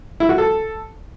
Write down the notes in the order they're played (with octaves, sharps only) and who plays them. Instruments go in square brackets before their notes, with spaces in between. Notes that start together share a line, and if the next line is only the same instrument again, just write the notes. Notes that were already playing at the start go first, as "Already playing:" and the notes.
[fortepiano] E4
F#4
A4